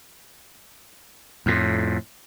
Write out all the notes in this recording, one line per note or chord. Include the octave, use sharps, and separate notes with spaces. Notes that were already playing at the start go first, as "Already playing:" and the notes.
F2 A2